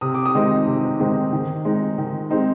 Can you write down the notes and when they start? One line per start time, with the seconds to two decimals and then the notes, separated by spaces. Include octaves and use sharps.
0.01 C3 D#6
0.14 D6
0.26 D#6
0.35 D#3 G#3 C4 D#4
0.67 C3
1.00 D#3 G#3 C4 D#4
1.33 D#3
1.65 G#3 C4 D#4
1.98 D#3
2.30 G#3 C4 D#4